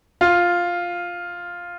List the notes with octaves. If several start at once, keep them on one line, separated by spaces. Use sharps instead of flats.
F4